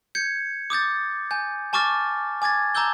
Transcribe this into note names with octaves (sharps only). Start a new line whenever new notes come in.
G6 G#6 C#7
D6 D#6 G6 A6
G#5 G6
G#5 A5 C#6 D6 F6 A6
G#5 D6 G#6 A6
A5 A#5 D6 E6 G6 G7